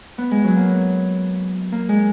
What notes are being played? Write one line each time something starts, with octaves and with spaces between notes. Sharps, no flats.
B3
G#3
F#3
A#3
B3
A#3
G#3